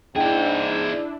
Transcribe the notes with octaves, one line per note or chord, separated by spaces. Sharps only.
G#2 D4 E4 G#4 D5 G5